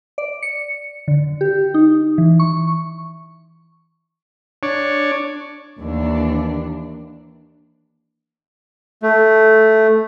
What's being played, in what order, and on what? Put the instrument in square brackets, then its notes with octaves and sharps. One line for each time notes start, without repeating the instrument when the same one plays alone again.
[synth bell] D5
C#7
D3
G4
D#4
E3
C#6
[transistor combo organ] D4 C#5
[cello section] D#2 E3 D4
[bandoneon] A3